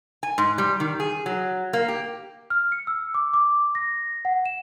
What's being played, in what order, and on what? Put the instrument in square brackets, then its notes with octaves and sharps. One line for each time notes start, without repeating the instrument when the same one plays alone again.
[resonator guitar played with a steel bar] G#5
G#2
G3
D#3
G#4
F#3
A#3
G4
[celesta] F6
C#7
E6
D6
D6
A#6
F#5
E7